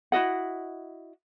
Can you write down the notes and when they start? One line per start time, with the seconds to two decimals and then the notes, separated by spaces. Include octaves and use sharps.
0.12 E4 F#4 D#5 F#5